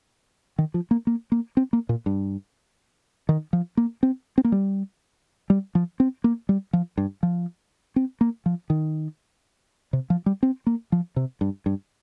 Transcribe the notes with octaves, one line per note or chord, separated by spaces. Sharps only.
D#3
F3
A#3
A#3
A#3
C4
A#3
A#2
G2
D#3
F3
A#3
C4
C4
A#3
G3
G3
F3
C4
A#3
G3
F3
G2
F3
C4
A#3
F3
D#3
C3
F3
G3
C4
A#3
F3
C3
G2
G2